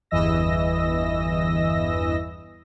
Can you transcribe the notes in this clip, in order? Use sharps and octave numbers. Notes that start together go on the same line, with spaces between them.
G1 E2 E3 D#5 E6 A#6